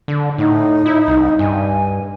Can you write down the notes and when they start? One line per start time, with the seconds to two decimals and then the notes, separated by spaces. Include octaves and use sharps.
0.08 D3
0.38 A2 D#4
0.86 E4
1.08 C2
1.39 G2 G#5